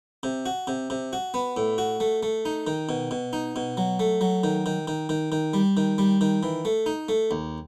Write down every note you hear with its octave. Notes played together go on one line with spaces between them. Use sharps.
C3
F#4
C3
C3
F#4
B3
A2
F#4
A3
A3
D#4
D#3
B2
B2
D#4
B2
F#3
A3
F#3
D#3
D#3
D#3
D#3
D#3
G3
D#3
G3
D#3
E3
A3
D#4
A3
D#2